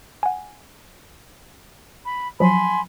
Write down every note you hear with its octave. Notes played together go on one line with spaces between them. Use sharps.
F#5 G#5
B5
F3 F#3 G#5 B5 C6